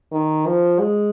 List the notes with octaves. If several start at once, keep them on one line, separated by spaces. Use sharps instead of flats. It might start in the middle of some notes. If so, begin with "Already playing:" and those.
D#3
F3
G#3